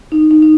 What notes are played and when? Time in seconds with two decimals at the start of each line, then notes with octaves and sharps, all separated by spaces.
0.12 D#4
0.31 D#4
0.42 D#4